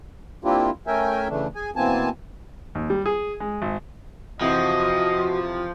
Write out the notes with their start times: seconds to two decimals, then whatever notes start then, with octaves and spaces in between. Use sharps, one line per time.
0.45 A#3 C4 D4 E4 F4 G4
0.87 A3 C#4 A#4 E5 G5 G#5
1.29 C#3 E3 A3 D4
1.55 G#4 G#5
1.76 B2 E3 A#3 C4 G#5 A5
2.75 D#2
2.90 G3
3.06 G#4
3.40 G#3
3.62 G#1
4.41 F2 C3 E3 F3 F#4 D#5